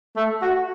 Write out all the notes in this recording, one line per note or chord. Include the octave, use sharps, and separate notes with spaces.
A3
F#4